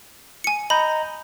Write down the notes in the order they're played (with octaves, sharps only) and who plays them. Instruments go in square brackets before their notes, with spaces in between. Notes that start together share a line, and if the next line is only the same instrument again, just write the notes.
[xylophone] G#5 C#7
[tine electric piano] D#5 A#5 G6 [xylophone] B5